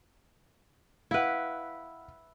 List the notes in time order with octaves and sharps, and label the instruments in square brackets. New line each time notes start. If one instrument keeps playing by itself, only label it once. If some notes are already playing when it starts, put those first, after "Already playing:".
[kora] E4 B4 [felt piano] F5 F#5